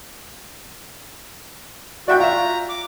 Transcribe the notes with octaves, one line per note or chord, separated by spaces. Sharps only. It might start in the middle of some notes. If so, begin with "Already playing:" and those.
F#4 D5 E5 G5
F4 E5 A#5
D6